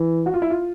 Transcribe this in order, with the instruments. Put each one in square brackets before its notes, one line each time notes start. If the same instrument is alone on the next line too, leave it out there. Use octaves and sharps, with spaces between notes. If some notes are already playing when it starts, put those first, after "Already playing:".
Already playing: [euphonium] E3
[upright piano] F#4
F4
E4
F4